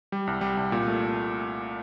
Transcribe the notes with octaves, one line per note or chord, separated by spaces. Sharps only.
G3
C2
G3
C2
A#2
A3